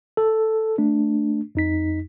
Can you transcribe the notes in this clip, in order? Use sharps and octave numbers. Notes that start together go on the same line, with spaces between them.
A4
A3 D4
F2 D#4 B6